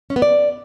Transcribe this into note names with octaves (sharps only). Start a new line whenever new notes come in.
C#4
B3
D5